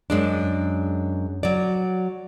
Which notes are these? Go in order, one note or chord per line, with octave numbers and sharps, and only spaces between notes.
F#2 G#3 D4
F#3 D5